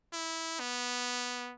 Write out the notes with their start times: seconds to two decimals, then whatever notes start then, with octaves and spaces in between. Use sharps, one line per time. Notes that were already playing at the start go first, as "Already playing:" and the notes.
0.13 E4
0.60 B3